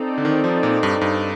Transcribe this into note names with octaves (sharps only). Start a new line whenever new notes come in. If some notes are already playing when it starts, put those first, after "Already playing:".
Already playing: C4 D#4 A4 D5
D3
D#3
F3
A#2
G2
G2